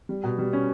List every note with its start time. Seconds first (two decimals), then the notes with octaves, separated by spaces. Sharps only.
0.09 G3
0.23 B2
0.38 G3
0.53 C#4